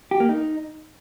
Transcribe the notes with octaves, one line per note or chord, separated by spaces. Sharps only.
G4
A#3
D#4